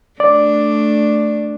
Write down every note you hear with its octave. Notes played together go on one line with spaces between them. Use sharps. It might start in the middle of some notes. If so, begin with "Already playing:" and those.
A3 D4 D5